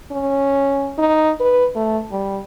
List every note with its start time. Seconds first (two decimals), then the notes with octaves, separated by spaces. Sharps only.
0.12 C#4
0.98 D#4
1.40 B4
1.76 A3
2.12 G3